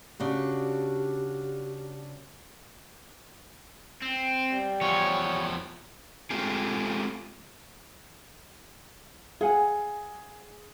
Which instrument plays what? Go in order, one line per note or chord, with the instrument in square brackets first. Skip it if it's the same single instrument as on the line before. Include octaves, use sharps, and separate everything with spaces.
[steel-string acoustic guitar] C#3 D4 F#4 [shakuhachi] G4
[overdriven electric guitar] C4
[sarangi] G3
[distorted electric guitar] E2 F3 [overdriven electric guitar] C#5
[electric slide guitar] G#3 A3 C4 F4 G4 G#4
[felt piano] G#4 [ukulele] F5 F#5 G#5